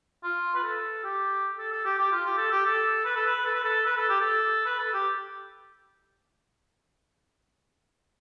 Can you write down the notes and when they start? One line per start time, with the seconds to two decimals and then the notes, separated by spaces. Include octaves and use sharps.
0.23 F4
0.55 B4
0.64 A4
1.04 G4
1.59 A4
1.72 A4
1.85 G4
1.98 G4
2.12 F4
2.26 G4
2.37 A4
2.51 G4
2.65 A4
3.05 B4
3.16 A4
3.27 B4
3.46 A4
3.55 B4
3.64 A4
3.86 B4
3.97 A4
4.09 G4
4.21 A4
4.66 B4
4.80 A4
4.94 G4